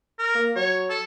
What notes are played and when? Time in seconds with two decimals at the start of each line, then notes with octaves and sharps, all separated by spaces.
0.19 A#4
0.35 A#3
0.56 F#3 C#5
0.90 A4